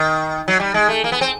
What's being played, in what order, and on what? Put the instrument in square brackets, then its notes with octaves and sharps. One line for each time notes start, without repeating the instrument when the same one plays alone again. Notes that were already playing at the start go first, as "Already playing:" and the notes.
Already playing: [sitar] D#3
F#3
G3
G#3
A3
A#3
B3
C4